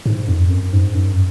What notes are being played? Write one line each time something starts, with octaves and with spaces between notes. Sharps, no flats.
G#2
F2
F#2
G#2
F#2